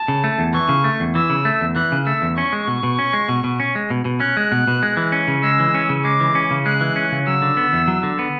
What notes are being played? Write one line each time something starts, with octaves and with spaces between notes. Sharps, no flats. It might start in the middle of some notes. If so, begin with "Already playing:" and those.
Already playing: A5
C#3
A3
E2
E3 C#6
C#3
A3
E2
E3 E6
C#3
A3
E2
E3 F#6
C#3
A3 E6
E2
C#4 C#6
G#3
B2
B2
C#4
G#3
B2
B2
C#4
G#3
B2
B2
C#4 F#6
G#3
B2
B2
G#3
E3
C#4
C#3
G#3 E6
E3
C#4
C#3
G#3 D6
E3
C#4
C#3
G#3 F#6
E3
C#4
C#3
F#3 E6
D3
B3
E2
F#3
D3
B3